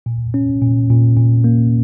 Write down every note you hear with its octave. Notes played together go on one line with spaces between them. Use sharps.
A#2
C#4
A#2
A#2
A#2
A#3